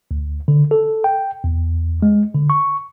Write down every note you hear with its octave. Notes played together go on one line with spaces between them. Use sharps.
D2
D3
A4
G5
E2
G#3
D3
C#6